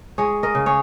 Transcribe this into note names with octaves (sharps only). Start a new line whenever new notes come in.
G#3 G#4 C#5
A#4 D#5
C#3
G#4 C#5